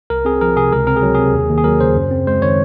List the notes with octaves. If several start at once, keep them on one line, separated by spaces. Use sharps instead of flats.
C2 A#4
C4 G#4
F3 A#4
C3 G#4
C#2 A#4
C4 A#4
G#4
F#3
C3 G#4
D#2
D#2
G#4
F#3 A#4
C#3 C5
F#2
C4
G#3 C5
D#3 C#5